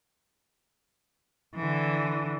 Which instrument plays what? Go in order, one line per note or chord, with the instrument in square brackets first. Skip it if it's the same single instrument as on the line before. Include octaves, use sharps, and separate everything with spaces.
[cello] D3 E3